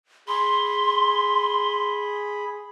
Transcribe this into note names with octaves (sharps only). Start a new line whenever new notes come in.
G#4 B5 C6